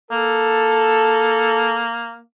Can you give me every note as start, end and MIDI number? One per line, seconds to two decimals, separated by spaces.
0.11 2.21 58
0.11 1.89 69